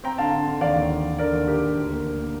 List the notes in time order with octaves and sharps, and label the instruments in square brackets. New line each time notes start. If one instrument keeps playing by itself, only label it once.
[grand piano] C4 G5 A#5
D3 F5 A5
D3
D3
D#2 D5 F5
D#2
D#2
D#2
D3 A#4 D5
D#2
D3 G4 A#4
D3
D2
A#3
D2
A#3